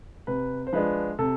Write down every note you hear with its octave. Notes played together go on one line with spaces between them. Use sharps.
C3 B4
C5
F3 G#3 D4 B4
C3 A4